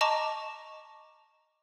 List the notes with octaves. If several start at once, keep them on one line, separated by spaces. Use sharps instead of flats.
D#5 A5 A#5 C#6 D6